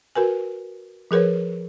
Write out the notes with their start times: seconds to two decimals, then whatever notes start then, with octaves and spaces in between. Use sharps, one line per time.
0.15 F#4 A#4 B4 G#5
1.11 F3 G#4 A#4 B4 C#5